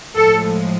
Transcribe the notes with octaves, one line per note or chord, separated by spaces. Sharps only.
A2 F3 G#3 A4